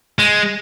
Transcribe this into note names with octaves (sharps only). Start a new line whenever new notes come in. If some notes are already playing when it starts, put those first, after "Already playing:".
G#3